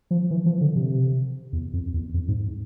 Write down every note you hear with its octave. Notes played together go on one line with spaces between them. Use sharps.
F3
E3
F3
D3
C3
E2
F2
E2
F2
G#2